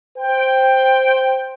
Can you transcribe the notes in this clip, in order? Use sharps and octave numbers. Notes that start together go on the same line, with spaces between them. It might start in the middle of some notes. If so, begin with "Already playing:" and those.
C5 G5